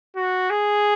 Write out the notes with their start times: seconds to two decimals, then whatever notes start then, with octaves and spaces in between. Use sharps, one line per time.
0.16 F#4
0.50 G#4